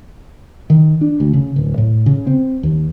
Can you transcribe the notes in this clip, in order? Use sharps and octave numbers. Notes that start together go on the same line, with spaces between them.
D#3
D4
D2
C#3
D1
A2
C#3
C4
D#2